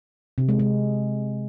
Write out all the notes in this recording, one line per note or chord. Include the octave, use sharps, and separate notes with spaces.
C3
G#3
G#3